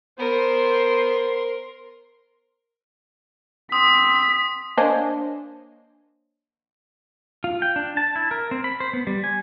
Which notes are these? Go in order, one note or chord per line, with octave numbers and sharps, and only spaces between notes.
B3 A#4 C5 C6
C4 D#6 B6
A#3 D4 C5 C#5 D#5 G#5
F4
G5
D4
A5
E4
A#4
C4
B5
C5
B3
G3
G#5